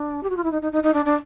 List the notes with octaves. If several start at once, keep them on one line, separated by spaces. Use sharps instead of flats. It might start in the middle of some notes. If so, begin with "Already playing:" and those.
Already playing: D4
G4
F#4
F4
E4
D#4
D#4
D#4
D#4
D4
D4